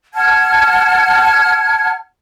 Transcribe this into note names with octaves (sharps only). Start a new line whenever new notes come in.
F#5 A5 F6 G#6